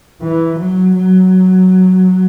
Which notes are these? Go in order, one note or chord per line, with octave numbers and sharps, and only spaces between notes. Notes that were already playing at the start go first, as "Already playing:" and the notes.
E3
F#3
F#3